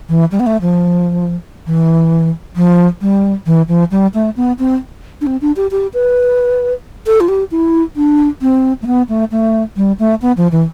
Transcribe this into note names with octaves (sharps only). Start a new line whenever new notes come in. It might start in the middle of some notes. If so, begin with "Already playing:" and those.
E3
G3
B3
A3
F3
E3
F3
G3
E3
F3
G3
A3
B3
C4
D4
C4
D4
G4
G4
B4
A4
F4
G4
E4
D4
C4
A3
B3
A3
A3
G3
A3
B3
F3
E3